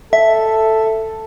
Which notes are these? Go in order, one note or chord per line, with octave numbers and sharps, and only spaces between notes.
A4 E5